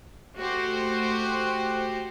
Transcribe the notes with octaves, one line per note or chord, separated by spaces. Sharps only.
A3 F#4 G4 C5